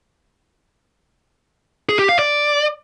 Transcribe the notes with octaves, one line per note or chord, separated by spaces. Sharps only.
G#4
G4
F5
D5